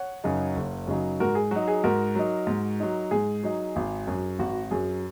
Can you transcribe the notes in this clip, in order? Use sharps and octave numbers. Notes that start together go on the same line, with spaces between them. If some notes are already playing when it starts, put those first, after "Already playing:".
Already playing: C#5 F#5
F#2 C#3 F#3 D#4
F#1
F#2 C#3 F#3 D#4
G#2 F#4 A#4
G#4
F#3 D#4 F#4
G#4
G#2 F#4 A#4
F#3 D#4
G#2
F#3 D#4
G#2 G#4
F#3 D#4
G#1
F#2 F#3
G#1 F#4
F#2 F#3 G#4